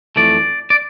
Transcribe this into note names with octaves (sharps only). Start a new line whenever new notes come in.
F2 E3 A3 D5
D5